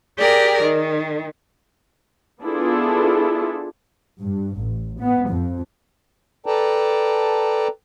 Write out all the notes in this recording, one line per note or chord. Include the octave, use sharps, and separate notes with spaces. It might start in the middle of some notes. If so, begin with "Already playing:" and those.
G4 G#4 A#4 D5
D#3
B3 D4 E4 F4 G#4 A4
G2
A1
B3
F2
A4 B4 D5 G5 A5 A#5